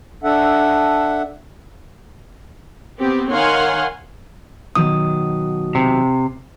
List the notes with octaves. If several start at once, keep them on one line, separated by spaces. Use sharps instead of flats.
D4 A4 E5 F#5
B3 C4 G4
D#3 C#5 F5 F#5 G#5 C6
B2 D#3 F#3 D#6
C3